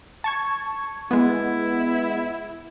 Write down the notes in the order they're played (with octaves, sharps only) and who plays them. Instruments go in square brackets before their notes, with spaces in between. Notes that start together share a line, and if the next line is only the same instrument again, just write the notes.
[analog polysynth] A5 C#6 G#6
[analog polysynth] G#3 B3 [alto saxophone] E4